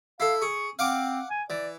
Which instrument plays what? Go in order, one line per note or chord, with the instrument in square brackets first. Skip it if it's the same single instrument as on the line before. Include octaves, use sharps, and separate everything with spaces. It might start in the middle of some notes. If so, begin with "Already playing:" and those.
[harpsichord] E4 A4 [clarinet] F5
[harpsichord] G#4 [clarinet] C#6
[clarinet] C4 [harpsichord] F5 F#5 D6
[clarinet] G#5
[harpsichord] E3 [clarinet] D5